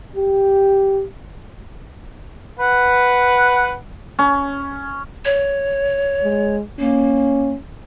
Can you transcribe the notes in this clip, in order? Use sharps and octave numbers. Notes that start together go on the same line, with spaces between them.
G4
B4 F#5
C#4
C#5
G#3
A#3 C#4